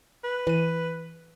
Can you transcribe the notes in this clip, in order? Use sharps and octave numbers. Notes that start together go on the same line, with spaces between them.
B4
E3 D#7